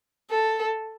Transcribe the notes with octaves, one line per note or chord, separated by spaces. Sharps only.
A4